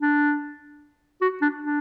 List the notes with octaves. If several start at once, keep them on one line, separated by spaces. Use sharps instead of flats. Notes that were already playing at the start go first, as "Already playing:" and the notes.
D4
F#4
D4
D4